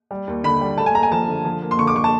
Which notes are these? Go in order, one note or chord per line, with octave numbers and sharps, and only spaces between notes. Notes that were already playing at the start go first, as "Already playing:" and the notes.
G3
D#2
D3 B5
G3
A3 A5
G#5
A3 A#5
G#5
F3 A5
D3
F3
A#3
C6
D3 C#6
D6
D3 C#6
A5